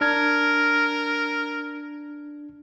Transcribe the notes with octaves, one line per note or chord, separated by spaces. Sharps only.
D4 A#4 F6 G#6